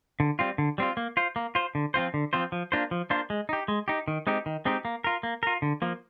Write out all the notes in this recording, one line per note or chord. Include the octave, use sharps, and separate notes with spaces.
D3
G3 C4 F4
D3
G3 C4 F4
A#3
F4 C5
A#3
F4 C5
D3
F3 C4 F4 C5
D3
F3 C4 F4 C5
F3
A#3 D4 F4 C5
F3
A#3 D4 F4 C5
G#3
D#4 G4
G#3
D#4 G4
D#3
G#3 C4 D#4 G4
D#3
G#3 C4 D#4 G4
A#3
F4 A#4
A#3
F4 A#4
D3
F3 A#3